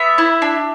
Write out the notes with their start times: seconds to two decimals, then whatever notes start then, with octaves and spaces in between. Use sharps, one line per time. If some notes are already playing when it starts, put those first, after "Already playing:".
Already playing: B3 E5
0.18 E4
0.42 D4